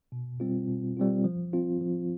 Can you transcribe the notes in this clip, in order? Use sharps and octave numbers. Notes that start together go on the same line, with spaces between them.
B2
G3 C4 F4
B2
G3 C4 F4
F3
C4 F4
F3